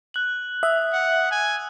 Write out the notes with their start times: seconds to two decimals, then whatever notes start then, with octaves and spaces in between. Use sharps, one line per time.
0.14 F#6 F#7
0.63 E5 D#6 E6
0.93 F#5
1.31 G#5